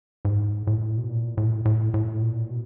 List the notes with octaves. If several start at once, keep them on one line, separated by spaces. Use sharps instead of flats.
G#2
A2
B2
A#2
A2
A2
A2
A#2
B2